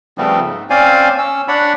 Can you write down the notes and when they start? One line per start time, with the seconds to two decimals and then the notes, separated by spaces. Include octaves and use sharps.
0.18 C#3 F3 G3 A3 B3 C4
0.46 G#2
0.70 C4 C#4 C5 D5 F5 G#5
1.18 C#4 E6
1.48 D4 C#5 D5 F#5 B5